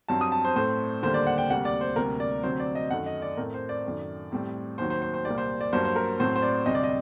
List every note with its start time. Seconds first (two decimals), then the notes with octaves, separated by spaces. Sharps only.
0.08 G2 F#3 C4 A5
0.21 D#6
0.32 A5
0.45 C5
0.55 A2 A3 C4 C5
1.03 D#2 D3 G3 A#3 C5
1.14 D5
1.27 F#5
1.38 G5
1.50 D2 C3 G3 A#3 F#5
1.65 D5
1.81 C5
1.96 D2 C3 G3 A#3 A#4
2.20 D5
2.43 D2 C3 F#3 C4 C5
2.60 D5
2.75 D#5
2.90 F#2 D#3 A3 F#5
3.06 D#5
3.22 D5
3.37 A2 A3 C4 A#4
3.54 C5
3.69 D5
3.85 F#2 D#3 A3
4.32 A2 G3 C4
4.78 D#2 D#3 F#3 C5
4.90 C5
5.02 C5
5.14 C5
5.25 C2 A#2 G3 A#3 D5
5.38 C5
5.61 D5
5.73 G2 F#3 A#3 C5
5.85 C5
5.96 A#4
6.20 A2 F#3 C4 C5
6.36 C5
6.42 D5
6.66 D2 C3 G3 C4 D#5
6.75 D5
6.84 D#5